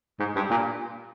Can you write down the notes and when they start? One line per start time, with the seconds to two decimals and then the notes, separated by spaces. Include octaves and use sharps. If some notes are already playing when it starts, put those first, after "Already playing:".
0.20 G#2
0.36 G2
0.51 A#2